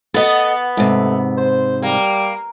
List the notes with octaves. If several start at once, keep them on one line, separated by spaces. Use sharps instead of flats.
B3 A4 D#5
G#2 C3 A3
C5
G3 A#3